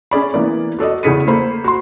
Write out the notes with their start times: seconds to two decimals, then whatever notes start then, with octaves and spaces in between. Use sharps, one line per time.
0.11 C#4 G#4 D5 B5
0.34 E3 A#3 B3 D5
0.79 F#4 A4 D5 D#5
1.03 E2 C#3 G#4 B6 C#7 D#7
1.27 A#3 A4 C5 B5
1.64 F#4 C6